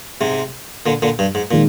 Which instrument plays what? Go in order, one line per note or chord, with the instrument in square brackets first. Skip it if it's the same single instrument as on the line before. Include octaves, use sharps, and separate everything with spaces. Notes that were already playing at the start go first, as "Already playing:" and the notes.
[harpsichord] G#2 C3
A#2 D3
A#2 D3
G2
G#2
[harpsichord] A#2 [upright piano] D#3 G#3